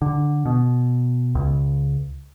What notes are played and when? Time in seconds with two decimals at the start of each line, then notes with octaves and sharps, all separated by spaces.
0.02 D3
0.45 B2
1.35 C#2